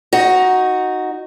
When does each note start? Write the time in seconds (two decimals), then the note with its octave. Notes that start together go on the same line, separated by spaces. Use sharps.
0.13 D#4 F#4